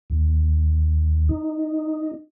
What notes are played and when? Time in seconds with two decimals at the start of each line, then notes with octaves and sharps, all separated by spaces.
0.10 D#2
1.29 D#4